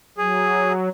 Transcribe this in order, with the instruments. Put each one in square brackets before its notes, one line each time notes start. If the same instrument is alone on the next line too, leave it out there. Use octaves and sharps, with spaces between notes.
[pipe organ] F#3 [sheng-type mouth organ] G#4